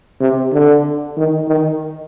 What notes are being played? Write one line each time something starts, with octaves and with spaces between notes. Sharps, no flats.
C3
D3
D#3
D#3